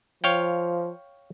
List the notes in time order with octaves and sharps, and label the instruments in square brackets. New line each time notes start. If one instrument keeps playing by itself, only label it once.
[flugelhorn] F3 [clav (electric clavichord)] C#5 F5 G5